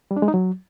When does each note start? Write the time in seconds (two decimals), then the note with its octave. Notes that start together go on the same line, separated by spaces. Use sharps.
0.11 G3
0.16 D4
0.22 G#3
0.28 D#4
0.34 F#3